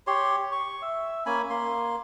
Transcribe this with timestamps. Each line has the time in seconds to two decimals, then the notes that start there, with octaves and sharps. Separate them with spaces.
0.07 G4 C#5 C6
0.52 C#6
0.82 E5
1.26 A#3 C#4 G#5 B5
1.50 A#3 C6